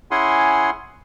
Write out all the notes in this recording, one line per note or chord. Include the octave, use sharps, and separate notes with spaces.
C#4 E4 G#4 F#5 G#5 C6